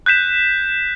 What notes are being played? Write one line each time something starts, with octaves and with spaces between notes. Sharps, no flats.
F#6 G6 B6 E7